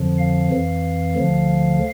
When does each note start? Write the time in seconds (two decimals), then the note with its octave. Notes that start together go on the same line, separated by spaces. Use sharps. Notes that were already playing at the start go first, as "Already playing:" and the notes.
Already playing: F2 D3 F3
0.18 F5
0.50 F2 E3
1.15 D2 D3 F3